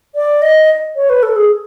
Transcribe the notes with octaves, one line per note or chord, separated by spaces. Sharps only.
D5
D#5
C#5
B4
A4
G#4